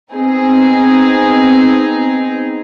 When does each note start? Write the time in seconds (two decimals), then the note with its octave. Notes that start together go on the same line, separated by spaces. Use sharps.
0.12 B3 C4 D#4 G#4